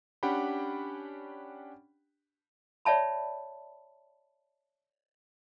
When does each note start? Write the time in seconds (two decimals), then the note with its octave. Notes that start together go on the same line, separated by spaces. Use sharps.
0.23 C#4 D4 G4 F#5 G5 B5
2.85 C#5 D5 E5 A5 B5